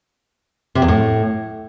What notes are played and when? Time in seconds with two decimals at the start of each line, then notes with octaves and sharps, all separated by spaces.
0.75 C3
0.82 E2
0.88 A2